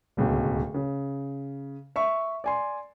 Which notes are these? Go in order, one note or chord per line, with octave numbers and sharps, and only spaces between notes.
D1 C#2 B2
C#3
E5 C#6
D5 G#5 C6